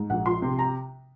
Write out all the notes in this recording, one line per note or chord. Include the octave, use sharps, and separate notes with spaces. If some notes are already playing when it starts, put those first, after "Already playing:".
Already playing: G#2
A#1 F#5
F3 C6
C3
A#5